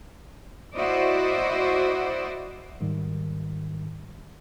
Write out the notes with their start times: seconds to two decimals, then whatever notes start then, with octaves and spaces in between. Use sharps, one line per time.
0.75 E4 F#4 C5 D5 D#5
2.81 G#2 D#3 G3